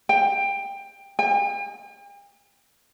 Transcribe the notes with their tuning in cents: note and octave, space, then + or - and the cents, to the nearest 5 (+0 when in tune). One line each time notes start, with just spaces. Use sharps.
G5 +15
G5 +45